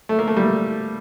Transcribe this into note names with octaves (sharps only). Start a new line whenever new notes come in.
A3
A#3
A3
G3